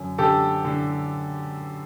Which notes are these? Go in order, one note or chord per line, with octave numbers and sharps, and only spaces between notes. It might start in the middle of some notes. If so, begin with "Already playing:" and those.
Already playing: F#2 D3
D3 G4 A4
D3